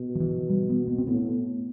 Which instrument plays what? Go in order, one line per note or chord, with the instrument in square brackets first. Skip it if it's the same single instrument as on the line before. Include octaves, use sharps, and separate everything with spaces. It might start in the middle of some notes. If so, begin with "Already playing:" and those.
Already playing: [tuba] B2
[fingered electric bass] F3
E3
G3
B3
B3
C4
[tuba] A2 [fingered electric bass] B3